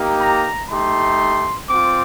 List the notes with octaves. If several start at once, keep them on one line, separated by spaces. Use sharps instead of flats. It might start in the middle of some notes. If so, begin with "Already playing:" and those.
Already playing: A#3 D#4 G4
A#5
A3 D#4 G4 C6
C4 F4 D6